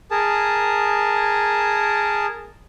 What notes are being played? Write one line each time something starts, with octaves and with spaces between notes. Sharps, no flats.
G#4 A#4 A5